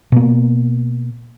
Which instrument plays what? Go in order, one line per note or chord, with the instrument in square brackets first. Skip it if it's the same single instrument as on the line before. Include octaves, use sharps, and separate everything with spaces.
[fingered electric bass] B2 A#3